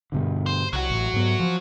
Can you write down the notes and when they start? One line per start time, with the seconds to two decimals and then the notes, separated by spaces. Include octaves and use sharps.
0.12 G2 B2 D3
0.46 C5
0.73 C2 F#3 F#4
0.90 A1
1.14 G#2 B3
1.40 F3